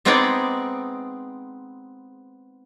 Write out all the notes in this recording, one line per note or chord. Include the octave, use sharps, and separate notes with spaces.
G#3 B3 C4 D#4 G#4 D5